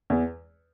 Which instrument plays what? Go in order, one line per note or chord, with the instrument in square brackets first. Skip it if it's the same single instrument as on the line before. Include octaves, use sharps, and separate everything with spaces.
[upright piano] E2